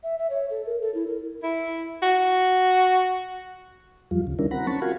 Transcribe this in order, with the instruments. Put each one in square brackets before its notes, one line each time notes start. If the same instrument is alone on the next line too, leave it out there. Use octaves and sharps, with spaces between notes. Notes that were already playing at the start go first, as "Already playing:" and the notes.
[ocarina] E5
E5
C#5
A4
A#4
A4
E4
A#4
[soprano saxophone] E4
F#4
[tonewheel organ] F2 F3 G3 F4
D2 C#3
D#3 G3 C#4 D4 E4 A#4
F#3 C4 F#5 A#5 B5
C#4 A5 B5 C#6
F4 F#4 A#4 F5 F#5 G#5